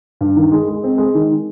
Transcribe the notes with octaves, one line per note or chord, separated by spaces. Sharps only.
G2
D#3
G#3
G#3
C4
G#3
D#3